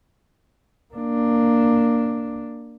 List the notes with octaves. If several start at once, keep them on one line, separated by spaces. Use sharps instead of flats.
A#3 D4